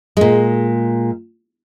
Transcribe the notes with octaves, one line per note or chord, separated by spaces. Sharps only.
A#2 G#3